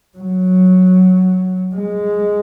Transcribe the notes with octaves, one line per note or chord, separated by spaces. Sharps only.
F#3
G#3